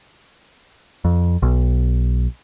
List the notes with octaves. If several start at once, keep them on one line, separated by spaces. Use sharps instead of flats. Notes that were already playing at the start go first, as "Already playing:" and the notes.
F2
B1